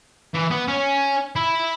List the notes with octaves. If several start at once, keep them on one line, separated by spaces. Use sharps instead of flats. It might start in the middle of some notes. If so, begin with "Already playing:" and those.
E3
B3
C#4
E4